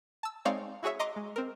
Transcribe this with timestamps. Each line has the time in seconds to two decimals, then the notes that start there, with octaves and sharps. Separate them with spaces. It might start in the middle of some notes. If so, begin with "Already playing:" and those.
0.23 A5 E6
0.45 G#3 C4 D#4 C#5 D5 F5
0.83 E4 F#4 G#4 C#5 E5
0.99 D#5 A#5 C6 D6
1.16 G#3
1.36 C4 A#4